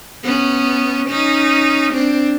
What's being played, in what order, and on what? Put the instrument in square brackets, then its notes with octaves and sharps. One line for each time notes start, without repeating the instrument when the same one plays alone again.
[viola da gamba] B3 C#4
C#4 D#4
C4 D4